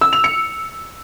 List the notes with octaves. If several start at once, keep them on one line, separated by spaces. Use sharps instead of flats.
E6
F7
C#7